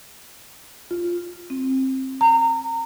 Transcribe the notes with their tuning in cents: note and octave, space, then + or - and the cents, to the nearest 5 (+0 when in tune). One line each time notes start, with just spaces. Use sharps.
F4 +5
C4 +20
A#5 -25